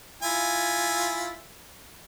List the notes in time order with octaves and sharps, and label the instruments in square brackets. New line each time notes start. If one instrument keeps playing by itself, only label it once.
[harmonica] E4 F4 G#5